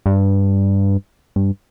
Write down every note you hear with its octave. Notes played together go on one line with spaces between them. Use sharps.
G2
G2